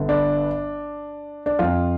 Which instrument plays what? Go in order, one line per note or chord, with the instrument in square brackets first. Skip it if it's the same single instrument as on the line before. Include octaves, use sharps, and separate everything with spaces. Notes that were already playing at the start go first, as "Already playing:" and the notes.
Already playing: [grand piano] G1 G2 D3
D4
D4
F2 F3 F4